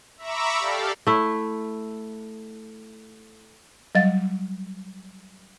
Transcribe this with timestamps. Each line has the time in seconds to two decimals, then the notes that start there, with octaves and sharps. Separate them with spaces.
0.17 E5 A#5 B5 C#6 D6 E6
0.59 G4 A4 D5 F5
1.07 A3 E4
3.95 F#3 G3 D#5 F5 A6